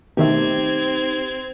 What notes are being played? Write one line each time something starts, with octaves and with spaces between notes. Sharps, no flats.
B2 D#3 A3 C4 D#4 G4 G#6